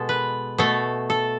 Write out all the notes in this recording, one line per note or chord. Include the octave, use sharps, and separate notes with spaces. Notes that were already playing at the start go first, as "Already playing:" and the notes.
Already playing: B2 G#3 A4
B4
B2 A3 A4
A4